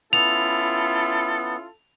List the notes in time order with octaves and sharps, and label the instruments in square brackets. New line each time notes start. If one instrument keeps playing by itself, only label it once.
[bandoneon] B3 [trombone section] C#4 E4 F4 [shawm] A4 [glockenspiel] F7